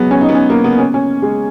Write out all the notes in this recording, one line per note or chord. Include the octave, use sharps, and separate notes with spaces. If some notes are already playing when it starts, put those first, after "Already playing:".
Already playing: F#3 G#3 B3
C#4
D#4
B3
C#4
A#3
B3
C#4
C#4
G#3